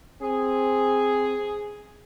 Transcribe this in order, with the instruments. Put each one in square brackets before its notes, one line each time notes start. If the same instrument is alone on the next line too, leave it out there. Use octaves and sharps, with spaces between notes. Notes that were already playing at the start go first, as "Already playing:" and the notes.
[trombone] C4 [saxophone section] G#4